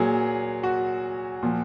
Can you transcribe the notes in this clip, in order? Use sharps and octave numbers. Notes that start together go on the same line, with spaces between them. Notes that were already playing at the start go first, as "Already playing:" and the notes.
Already playing: A#2 F#3 G#4
F#4
A#2 F3